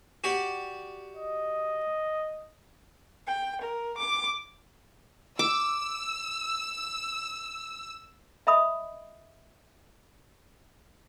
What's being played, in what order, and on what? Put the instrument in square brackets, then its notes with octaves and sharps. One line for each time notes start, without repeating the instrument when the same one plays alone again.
[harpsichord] F#4 G4 D5
[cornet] D#5
[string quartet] G5
A#4
D6
[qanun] D6 [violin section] E6
[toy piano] D#5 E5 B5 D#6